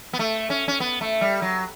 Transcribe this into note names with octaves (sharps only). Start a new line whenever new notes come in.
B3
A3
C#4
C#4
B3
A3
G3
F#3